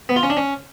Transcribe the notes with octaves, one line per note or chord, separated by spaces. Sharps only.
B3
F4
C#4
D4
C#4